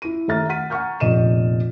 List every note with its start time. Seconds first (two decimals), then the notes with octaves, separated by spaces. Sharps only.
0.02 E4 D#7
0.28 D#2 A3 E5 A#5 F6 A6
0.49 F#5 F6 B6 D#7
0.70 F#5 G#5 A#5 C#6 F6 G6
1.00 F1 A#1 A#2 D#5 D#7 E7